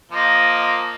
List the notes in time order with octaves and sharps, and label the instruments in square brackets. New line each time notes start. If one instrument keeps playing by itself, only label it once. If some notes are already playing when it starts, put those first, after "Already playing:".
[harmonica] F3 A#3 D#5